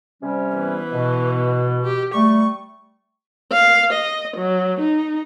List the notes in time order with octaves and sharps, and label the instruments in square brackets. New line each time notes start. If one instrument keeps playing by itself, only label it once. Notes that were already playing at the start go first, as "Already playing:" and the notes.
[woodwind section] C3 G3 C#4
[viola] E3 B3
[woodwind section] B2
[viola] G4
[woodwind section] G3 A3 [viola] C#6
[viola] F5
D#5
F#3
D#4